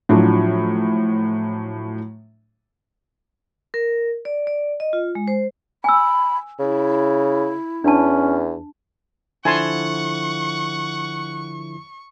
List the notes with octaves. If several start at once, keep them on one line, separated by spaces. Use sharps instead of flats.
A2 F3 F#3 D4
A#4
D5
D5
D#5
F4
G#3
C5
G#5 B5 E6
C#3 E4
E2 C#4 D4 A5
D3 F3 E4 F#5 G#5 A5 C6 C#6